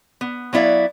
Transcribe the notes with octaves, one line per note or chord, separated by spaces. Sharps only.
B3
F#3 B3 E4 D5 F5